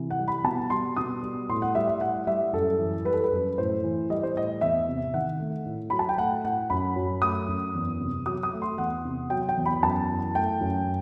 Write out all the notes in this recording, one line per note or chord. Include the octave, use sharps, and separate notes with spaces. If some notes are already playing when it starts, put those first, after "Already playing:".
Already playing: C3 E3
F#5
G3
B5
B2 A5
G3 C6
B2 D#6
G3
A2 C6
F#5
G3 E5
E5
A2 F#5
G3 E5
F#2 A4
E3
G3 B4
A4
B4
F#2
A2 C5
E3
G3 D#5
C5
A2 D#5
E2 E5
C3
D#3 F#5
A3
A2
F#3 B5
A5
G5
A3 F#5
A2 F#5
F#2 B5
F#3
A3 D#6
F#2
E2
C3
F#3 D#6
D#6
A3
C6
E2 F#5
C3
F#3 G5
G5
E2
B5
F#2 A5
E3
A3 G5
F#2